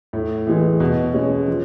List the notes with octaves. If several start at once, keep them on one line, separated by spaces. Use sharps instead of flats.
A2
E3 G#3
B2
G#3 C#4
F3